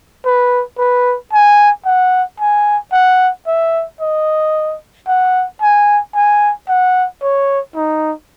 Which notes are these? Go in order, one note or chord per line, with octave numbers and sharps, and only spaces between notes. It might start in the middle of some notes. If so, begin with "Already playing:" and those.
B4
B4
G#5
F#5
G#5
F#5
E5
D#5
F#5
G#5
G#5
F#5
C#5
D#4